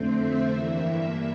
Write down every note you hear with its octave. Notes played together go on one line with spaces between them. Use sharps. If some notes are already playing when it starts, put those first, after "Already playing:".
Already playing: F2 D3 A3 C4 C5
E5
G2 E3 A#3 E5
E5